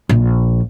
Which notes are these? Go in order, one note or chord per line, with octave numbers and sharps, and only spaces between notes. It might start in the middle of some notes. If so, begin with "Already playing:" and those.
A#1